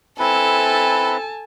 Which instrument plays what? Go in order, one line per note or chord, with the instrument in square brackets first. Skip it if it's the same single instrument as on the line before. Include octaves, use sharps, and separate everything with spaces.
[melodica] C4 E4 B4 [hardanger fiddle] A4 [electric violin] G#5 A5